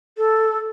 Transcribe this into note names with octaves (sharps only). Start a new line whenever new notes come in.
A4